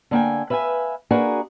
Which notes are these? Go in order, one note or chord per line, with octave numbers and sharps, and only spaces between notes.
D3 A#3 G5 G#5
B4 E5 F5 G5 G#5
A#3 D4 F#4 G#4 A#4 B4